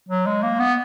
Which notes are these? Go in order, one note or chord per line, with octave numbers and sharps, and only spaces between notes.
F#3
G#3
A#3
B3